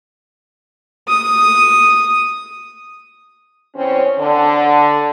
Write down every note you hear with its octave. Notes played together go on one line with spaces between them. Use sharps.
D#6
E2 C4 C#4
D3